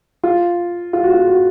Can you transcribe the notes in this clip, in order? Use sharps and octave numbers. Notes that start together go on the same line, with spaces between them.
F4
F4
F#4
F4
F#4